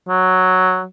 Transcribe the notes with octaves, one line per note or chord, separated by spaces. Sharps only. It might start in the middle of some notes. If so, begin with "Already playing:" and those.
F#3